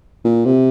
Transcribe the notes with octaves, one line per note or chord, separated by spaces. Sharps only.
A#2
C3